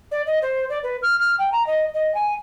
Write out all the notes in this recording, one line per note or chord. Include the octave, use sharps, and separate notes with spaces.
D5
D#5
C5
D5
B4
F6
F6
G5
A#5
D#5
D#5
G#5